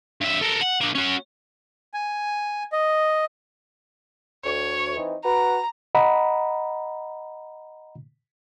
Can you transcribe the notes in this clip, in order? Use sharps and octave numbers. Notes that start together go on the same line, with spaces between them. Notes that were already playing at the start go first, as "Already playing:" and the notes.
G2 E5
A4 A#4
F#5
A#3 D4
C#4 F#4
G#5
D#5
D2 C#5
E3 C4 D#4
F#4 B4 A#5
D#5 F#5 A#5 B5